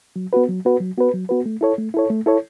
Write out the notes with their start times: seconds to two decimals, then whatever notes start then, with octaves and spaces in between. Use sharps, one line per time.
0.16 F#3
0.33 B3 F#4 B4
0.49 F#3
0.65 B3 F#4 B4
0.80 F#3
0.97 B3 F#4 B4
1.14 F#3
1.29 B3 F#4 B4
1.46 A3
1.61 E4 A4 C#5
1.78 A3
1.94 E4 A4 C#5
2.10 A3
2.26 E4 A4 C#5